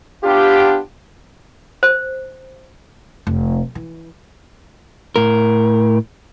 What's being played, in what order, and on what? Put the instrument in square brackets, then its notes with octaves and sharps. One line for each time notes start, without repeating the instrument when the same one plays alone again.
[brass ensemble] B3 D4 F4 G4
[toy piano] C5
[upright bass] F1
E3
[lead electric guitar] A2 A#4